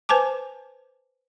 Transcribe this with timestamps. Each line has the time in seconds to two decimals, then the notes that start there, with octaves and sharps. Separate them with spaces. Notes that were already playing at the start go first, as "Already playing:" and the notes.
0.09 B4 C5 G#5 A5 D6